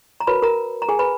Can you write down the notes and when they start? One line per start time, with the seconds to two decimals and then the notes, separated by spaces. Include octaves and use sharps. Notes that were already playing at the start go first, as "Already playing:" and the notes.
0.20 A#5
0.27 F#4 A#4 B4 C#5 B5
0.42 A#4 A#5
0.82 A#5
0.89 G#4 G#5
0.99 B4 B5